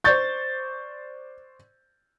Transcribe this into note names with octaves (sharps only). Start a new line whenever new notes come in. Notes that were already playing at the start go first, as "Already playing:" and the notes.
C5 D5 C#6 G6 A6